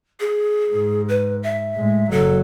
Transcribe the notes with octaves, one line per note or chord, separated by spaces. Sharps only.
G#4
G#2
B4
E5
A2 G#3
F#1 F#3 A4